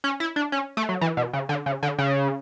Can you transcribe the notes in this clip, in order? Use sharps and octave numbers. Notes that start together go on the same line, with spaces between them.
C#4
E4
D4
C#4
A3
F#3
E3
B2
C#3
D3
C#3
D3
C#3